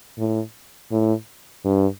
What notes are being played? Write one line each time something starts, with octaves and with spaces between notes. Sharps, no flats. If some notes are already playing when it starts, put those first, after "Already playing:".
A2
A2
G2